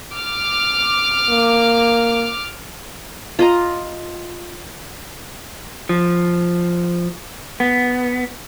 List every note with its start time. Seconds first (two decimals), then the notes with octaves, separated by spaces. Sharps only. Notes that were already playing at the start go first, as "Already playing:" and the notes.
0.15 D6 F6
1.30 A#3
3.39 F4 D#5 A#5
5.89 F3
7.60 B3